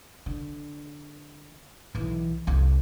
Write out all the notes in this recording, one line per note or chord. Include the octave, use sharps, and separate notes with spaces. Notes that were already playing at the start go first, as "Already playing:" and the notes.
D3
B1 E3
C2 F2